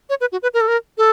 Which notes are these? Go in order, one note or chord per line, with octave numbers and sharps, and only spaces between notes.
C#5
B4
F#4
B4
A#4
A4
A#4
A4